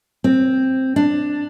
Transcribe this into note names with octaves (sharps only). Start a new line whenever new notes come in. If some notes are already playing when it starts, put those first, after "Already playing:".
C4
D4